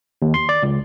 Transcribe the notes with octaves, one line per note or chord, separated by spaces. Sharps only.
D#2
C6
D5
C#2